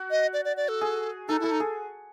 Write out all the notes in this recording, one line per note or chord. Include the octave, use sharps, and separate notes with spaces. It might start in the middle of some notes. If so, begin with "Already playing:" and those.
Already playing: F#4
D#5
D5
D5
D5
A4
G#4
D#4 A4
E4
A4
D#4
G#4